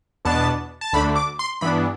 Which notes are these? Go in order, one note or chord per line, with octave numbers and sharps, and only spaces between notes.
E2 B2 B3 D4 A5
A5
D2 D3 A3 D4 B5
D6
C6
G2 E3 B3 D4 B5